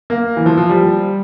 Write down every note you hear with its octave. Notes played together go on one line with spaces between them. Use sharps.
A#3
E3
F3
F3
G3